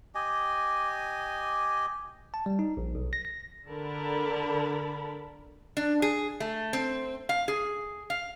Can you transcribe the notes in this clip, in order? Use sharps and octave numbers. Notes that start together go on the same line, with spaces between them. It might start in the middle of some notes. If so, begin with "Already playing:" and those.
G4 D#5 G#5
A5
G3
D#4
A#1
B1
A#6
A#6
D3 A#4 A5 B5
D4
G#4
A3
C4
F5
G#4
F5